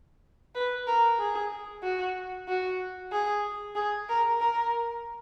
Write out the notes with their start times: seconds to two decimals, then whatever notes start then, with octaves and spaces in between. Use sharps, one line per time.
0.55 B4
0.87 A#4
1.19 G#4
1.83 F#4
2.48 F#4
3.12 G#4
3.75 G#4
4.09 A#4
4.40 A#4